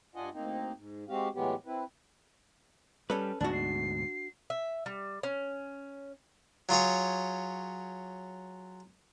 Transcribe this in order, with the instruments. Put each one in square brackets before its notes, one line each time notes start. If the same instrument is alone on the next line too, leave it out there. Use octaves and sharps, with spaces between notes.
[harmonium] G2 D4 F4 D#5 F#5 G#5
D2 A#3 C4 D#4
G#2
G#3 C4 F#4 G4 F5
A2 E3 F#3 G#3 B3 G4
C4 E4 B4
[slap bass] G3 [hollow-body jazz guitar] C#4 A4 B4
[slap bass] D2 G#2 B2 [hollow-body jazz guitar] D4 F#4 [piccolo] A5
[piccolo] C7
[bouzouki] E5
G3
C#4
[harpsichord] F#3 F4 G#4 C#5